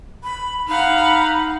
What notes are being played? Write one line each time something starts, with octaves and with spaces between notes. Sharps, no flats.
B5
D#4 F5 F#5 B5